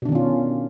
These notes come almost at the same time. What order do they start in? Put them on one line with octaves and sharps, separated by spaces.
B2 D4 D#3 C#4 F4